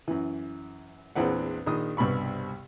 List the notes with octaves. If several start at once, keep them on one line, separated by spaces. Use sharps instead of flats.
F#2 E3
A#1 E2 E3 C4 B4 F#5
A#1 D#3 D#6
C2 G2 B2 B5 C#6